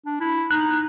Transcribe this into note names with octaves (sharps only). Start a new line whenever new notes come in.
D4
E4
D#4 F#6